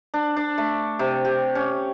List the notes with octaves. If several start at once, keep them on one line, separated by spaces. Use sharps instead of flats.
D4
D4
A3
C3
G4
C#4